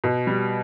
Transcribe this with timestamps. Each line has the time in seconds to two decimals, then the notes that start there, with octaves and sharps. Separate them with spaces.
0.04 B2
0.27 G3